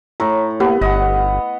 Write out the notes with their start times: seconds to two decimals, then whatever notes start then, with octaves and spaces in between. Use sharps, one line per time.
0.20 A2 A#5
0.60 A#3 B3 G4
0.81 G1 D#5 F#5